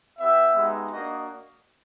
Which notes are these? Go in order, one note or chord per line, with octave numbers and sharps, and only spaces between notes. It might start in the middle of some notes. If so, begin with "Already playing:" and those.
B3 E4 G4 E5
G#3 B3 D#4 G4
A#3 D4 F#4 D#5